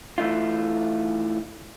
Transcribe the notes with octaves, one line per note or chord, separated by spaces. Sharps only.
E3 A3 D#4 F4